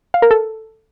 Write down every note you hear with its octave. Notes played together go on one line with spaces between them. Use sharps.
F5
A#4
A4